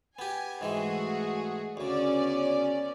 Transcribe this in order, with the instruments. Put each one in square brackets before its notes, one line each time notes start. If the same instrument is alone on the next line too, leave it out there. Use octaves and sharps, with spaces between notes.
[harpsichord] B3 G4 [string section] G#5
[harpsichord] G#2 E3 G#3 [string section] A3 F#4 G#4
[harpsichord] D2 C#3 [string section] B3 C#4 D5